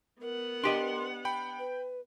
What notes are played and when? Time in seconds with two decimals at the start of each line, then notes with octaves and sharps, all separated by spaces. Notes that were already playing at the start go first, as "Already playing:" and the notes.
0.22 B3 A#4 F#5
0.64 D4 G4 D#5 C6
1.25 G5 B5
1.59 B4